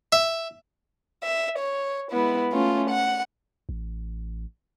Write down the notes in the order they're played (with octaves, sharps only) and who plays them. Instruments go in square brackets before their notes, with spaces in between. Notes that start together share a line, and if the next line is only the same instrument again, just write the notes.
[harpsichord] E5
[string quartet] E5
C#5
G#3 B3 E4
A3 C#4 F4
F#5
[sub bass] A1